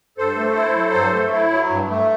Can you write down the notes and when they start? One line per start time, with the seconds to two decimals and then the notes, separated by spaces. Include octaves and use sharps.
0.18 G2 A4 C5
0.36 A3
0.56 E4
0.75 F#3
0.94 G2
1.13 A3
1.32 E4
1.50 F#3
1.70 G2
1.88 A3